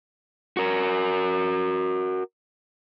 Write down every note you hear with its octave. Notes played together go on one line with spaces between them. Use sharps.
F#4 A#4